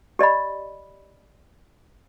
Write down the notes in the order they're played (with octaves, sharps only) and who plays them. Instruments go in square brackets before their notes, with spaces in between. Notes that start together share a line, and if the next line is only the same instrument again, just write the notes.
[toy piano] G4 D5 D#5 B5